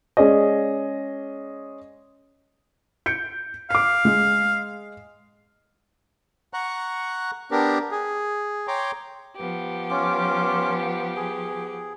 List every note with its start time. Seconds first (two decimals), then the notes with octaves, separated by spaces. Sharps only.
0.17 G#3 C#4 G#4 D5 D#5
3.06 G6 C#7 D7
3.70 F5 D6 C7
4.05 G#3
6.53 F#5 A#5 C#6 F#6
7.51 B3 D4 G4 A#4
7.92 G#4
8.68 C#5 G5 A#5 C6 D6
9.36 F3 B3 G4
9.90 C#4 F4 D6
11.16 G#4